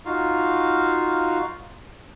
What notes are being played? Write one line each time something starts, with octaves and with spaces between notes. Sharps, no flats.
D#4 F4 F#4 F5